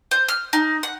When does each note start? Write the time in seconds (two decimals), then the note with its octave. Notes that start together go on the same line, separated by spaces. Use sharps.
0.11 C5
0.28 F6
0.53 D#4
0.83 F#5